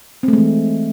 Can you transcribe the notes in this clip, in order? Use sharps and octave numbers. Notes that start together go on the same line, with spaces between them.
E3 G#3 A3 C4